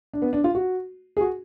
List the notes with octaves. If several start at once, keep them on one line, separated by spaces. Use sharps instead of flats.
D4
B3
D4
F4
F#4
G#4
F#4